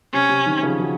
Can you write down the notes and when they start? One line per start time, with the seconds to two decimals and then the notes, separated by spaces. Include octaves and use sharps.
0.13 C3 C#4
0.29 C3
0.46 C3 D#3
0.63 C#3 F3
0.80 D#3 F#3